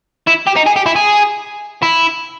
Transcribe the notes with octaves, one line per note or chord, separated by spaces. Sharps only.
E4
G4
D#4
G#4
G4
E4
G#4
E4